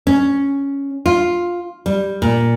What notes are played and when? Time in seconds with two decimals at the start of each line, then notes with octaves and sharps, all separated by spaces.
0.07 C#4
1.06 F4
1.86 G3
2.22 A#2